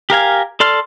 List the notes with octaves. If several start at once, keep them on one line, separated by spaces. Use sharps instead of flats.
G4 A#4 F5 G#5
A4 D5 C6 F6